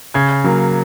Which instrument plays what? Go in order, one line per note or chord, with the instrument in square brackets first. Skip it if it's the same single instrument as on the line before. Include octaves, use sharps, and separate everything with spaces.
[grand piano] C#3 G#6
F#3 A#3